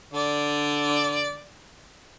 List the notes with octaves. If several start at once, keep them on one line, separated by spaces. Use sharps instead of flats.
D3 D5